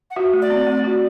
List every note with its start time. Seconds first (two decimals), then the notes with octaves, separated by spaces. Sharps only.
0.11 F#5
0.16 F#4 E5
0.33 A3
0.42 D5
0.50 C4
0.67 A3
0.84 F#4